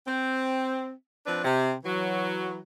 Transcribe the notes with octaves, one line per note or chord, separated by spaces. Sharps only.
C4
F3 C4 D4 B4
C3
E3 F#3